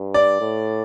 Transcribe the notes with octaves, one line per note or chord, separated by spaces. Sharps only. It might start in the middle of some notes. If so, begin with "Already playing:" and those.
Already playing: G2
D5
A2